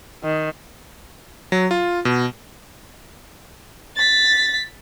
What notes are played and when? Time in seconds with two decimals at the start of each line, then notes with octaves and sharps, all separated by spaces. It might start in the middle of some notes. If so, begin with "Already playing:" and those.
0.24 D#3
1.52 F#3
1.71 F4
2.05 B2
3.96 A6 B6